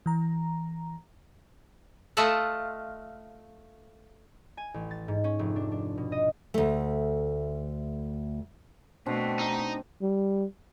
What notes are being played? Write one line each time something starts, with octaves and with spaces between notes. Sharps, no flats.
E3 A#5
A3 F4 A4 D#5 E5 F#5
G#5
A1
A6
G#2
C#4
F1
D4
D4
B2
D#5
D2 A3
B2 A3 C4 D4
D#4
G3